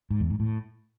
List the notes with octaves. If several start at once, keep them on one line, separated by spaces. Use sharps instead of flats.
G#2
E2
G#2
A2